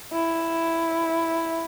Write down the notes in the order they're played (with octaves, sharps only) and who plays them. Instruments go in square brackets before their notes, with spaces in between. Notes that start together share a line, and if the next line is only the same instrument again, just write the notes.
[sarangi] E4